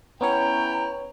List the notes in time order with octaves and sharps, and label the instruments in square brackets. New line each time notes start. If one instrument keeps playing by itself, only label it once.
[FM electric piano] B3 C#4 C#5 [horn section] E4 G5 [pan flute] A#5